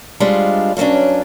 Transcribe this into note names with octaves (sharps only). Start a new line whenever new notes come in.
G3 G#3 C4 D4 F4
G2 F#3 B3 C#4 D4